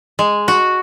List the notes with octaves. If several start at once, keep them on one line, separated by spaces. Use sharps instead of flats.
G#3
F#4